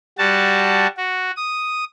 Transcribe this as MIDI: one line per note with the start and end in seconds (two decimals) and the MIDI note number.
0.18 0.87 55
0.18 0.87 66
0.18 0.87 81
0.97 1.31 66
1.36 1.84 87